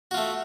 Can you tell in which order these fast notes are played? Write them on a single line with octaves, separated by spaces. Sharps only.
F#4 F4 A3